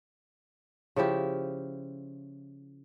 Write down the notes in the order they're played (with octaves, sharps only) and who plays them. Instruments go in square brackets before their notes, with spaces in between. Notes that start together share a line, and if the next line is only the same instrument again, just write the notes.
[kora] C#3 F3 E4 G4